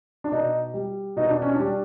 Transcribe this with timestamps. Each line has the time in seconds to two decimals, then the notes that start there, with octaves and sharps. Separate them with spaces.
0.24 D4
0.32 B2 D#4
0.74 G3
1.16 B2 D#4
1.29 D4
1.42 C#4
1.54 G3 D4